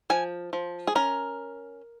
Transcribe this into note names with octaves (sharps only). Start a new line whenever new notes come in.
F3 G#5
F3
G#4
C#4 A#4